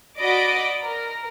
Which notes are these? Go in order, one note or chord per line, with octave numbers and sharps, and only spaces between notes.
F#4 D5 D#5 B5 D6 D7
A#4